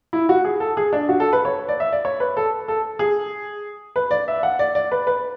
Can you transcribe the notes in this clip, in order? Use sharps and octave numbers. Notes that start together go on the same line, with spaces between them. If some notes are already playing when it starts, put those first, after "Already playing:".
E4
F#4
G#4
A4
G#4
D4
F#4
A4
B4
C#5
D5
E5
D5
C#5
B4
A4
A4
G#4
B4
D5
E5
F#5
D5
D5
B4
B4